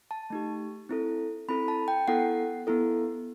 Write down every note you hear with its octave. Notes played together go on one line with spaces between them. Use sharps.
A5
A3 D#4 G4
C4 E4 A4
C4 E4 A4 B5
A5
G5
B3 E4 A4 F#5
B3 E4 A4